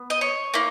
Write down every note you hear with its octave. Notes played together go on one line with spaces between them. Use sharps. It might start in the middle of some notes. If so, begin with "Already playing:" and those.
Already playing: B3
D#5
C#5
A#3 E4